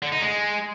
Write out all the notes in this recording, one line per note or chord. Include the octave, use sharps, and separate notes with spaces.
D3
D#4
G#3